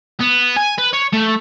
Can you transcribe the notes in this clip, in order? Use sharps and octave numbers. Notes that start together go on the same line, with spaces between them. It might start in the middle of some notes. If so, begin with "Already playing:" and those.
B3
G#5
B4
C#5
A3